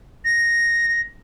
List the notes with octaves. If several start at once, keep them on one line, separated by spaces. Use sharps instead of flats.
A#6